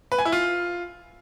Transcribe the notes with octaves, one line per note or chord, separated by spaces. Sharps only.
B4
G#5
E4
F4